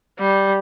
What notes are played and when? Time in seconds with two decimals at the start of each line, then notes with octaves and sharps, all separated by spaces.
0.19 G3